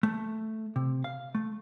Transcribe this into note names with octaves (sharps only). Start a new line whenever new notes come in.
A3
C3
F5
A3